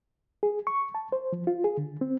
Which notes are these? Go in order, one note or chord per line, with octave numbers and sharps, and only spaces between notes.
G#4
C#6
A5
C5
F3
F4
G#4
D3
C4